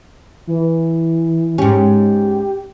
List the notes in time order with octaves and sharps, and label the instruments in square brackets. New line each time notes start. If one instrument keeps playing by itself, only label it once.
[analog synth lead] E3
[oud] G#2 C#4 [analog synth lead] G4